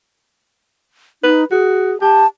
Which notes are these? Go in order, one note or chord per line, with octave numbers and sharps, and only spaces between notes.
D#4 B4
F#4 G#4
G4 A5